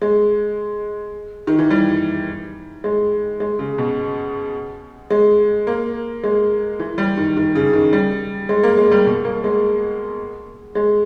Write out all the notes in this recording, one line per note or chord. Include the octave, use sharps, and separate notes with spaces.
G#3
D#3
E3
G3
G#3
G#3
C#3
B2
G#3
A#3
G#3
E3
G3
D#3
D#3
C#3
D#3
G3
G#3
A#3
G#3
G3
B2
A#3
G#3
G#3